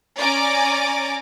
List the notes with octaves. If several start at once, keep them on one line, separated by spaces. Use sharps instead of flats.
C#4 D5 G#5 A#5 D6